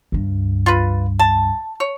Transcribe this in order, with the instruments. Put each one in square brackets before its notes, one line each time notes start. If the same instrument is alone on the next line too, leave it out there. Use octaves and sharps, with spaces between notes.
[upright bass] C#2 G2
[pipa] F4 B4
A5
C#5